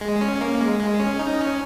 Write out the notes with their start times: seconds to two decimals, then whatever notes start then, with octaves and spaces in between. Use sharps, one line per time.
0.01 G#3
0.21 C#4
0.41 A#3
0.61 G#3
0.80 G#3
1.00 C#4
1.19 D#4
1.40 C#4